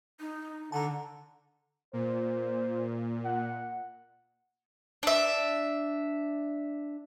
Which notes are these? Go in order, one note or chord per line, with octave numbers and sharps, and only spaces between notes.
D#4
D3 F#5 A5 A#5
A#2 C5
F#5
D4 E5